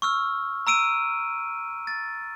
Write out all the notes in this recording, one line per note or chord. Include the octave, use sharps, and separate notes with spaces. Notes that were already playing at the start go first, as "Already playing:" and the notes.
C#6 E6 F6
A#5 E6 D7 D#7
A6